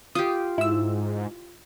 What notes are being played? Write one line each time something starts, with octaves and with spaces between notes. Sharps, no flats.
F4 G4 D#6
G#2 E4 E6